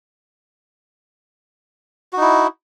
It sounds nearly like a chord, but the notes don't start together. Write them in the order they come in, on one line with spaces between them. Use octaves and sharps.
F#4 D#4 E4